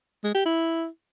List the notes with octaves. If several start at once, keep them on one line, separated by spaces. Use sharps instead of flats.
G#3
G4
E4